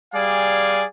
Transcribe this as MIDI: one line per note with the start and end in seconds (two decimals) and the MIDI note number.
0.13 0.83 55
0.13 0.83 68
0.13 0.83 74
0.13 0.83 77
0.13 0.83 80